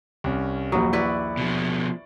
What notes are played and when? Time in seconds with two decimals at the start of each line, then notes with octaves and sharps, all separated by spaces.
0.24 C2 C#4
0.72 A#1 D#2 F#3 D#6
0.93 E4 B4 D5 C#6
1.37 B2 F3